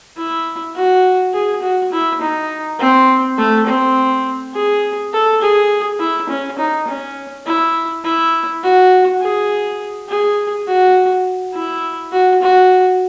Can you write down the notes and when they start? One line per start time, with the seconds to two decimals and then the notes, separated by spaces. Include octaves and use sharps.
0.17 E4
0.75 F#4
1.33 G#4
1.62 F#4
1.92 E4
2.21 D#4
2.79 C4
3.38 A3
3.67 C4
4.54 G#4
5.13 A4
5.42 G#4
6.00 E4
6.30 C#4
6.58 D#4
6.88 C#4
7.46 E4
8.04 E4
8.63 F#4
9.21 G#4
10.09 G#4
10.67 F#4
11.54 E4
12.12 F#4
12.42 F#4